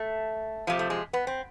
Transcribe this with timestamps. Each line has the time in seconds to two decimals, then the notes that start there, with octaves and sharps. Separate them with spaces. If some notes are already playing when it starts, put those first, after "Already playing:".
Already playing: A3
0.67 C3 F3 A3
0.79 A3
0.90 G#3
1.13 B3
1.27 C4